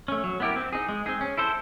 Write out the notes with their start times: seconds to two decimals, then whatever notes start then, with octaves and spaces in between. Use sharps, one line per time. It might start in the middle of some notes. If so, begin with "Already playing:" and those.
0.08 A3 C#4
0.24 F#3
0.40 B3 E4 G4 A#4
0.56 C4
0.73 D#4 G#4
0.89 G#3
1.06 C4 D#4 G#4
1.21 C#4
1.38 E4 A4 C5